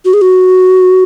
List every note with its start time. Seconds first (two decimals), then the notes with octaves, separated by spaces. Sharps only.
0.05 F#4
0.14 G#4
0.21 F#4